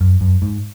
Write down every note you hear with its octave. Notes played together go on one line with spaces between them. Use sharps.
F#2
F#2
G#2